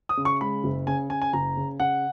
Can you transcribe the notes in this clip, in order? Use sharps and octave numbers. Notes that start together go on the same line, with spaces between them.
D#6
C#3
C#6
G#3 B5
F#1
C#3 G#5
C#3 G#5
G#5
F#1 A#5
C#3
C#3 F#5